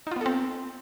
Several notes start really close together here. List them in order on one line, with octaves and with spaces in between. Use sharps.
D#4 F4 B3 A4 C4